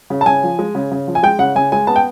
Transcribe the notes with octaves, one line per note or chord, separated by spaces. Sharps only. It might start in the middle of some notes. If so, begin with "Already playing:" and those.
C#3
A5
C#3 G#5
F3
G#3
C#3
C#3
F3
G#5
G#3 G5
C#3 F#5
C#3 G#5
G#3 G#5
B3 A5
G5